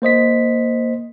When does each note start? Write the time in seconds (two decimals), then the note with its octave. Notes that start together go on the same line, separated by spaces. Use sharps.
0.02 A#3 C5 D#5 B6